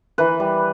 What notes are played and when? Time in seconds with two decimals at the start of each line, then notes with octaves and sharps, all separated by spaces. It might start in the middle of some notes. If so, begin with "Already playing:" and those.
0.18 E3 B4
0.40 G3